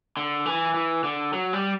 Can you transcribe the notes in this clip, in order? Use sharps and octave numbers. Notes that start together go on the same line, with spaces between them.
D3
E3
E3
D3
F#3
G3